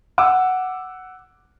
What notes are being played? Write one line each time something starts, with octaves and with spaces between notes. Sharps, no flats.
F#5 D6 E6